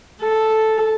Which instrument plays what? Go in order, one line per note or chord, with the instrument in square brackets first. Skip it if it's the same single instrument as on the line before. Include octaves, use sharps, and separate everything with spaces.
[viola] A4